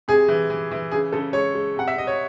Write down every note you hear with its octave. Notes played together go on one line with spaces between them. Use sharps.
C3 G#4
E3
E3
E3
C#3 G#4
C#3 A4
G#3 C#5
G#3
C3 F#5
E5
C3 D#5
C#5